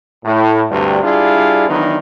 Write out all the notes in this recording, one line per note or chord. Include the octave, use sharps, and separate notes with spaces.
A2
D2 G2 C3 G3
G3 D4 E4 F4 G#4
D#3 E3 F#3 B3 D4